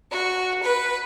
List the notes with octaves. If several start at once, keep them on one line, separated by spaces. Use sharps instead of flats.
F#4
B4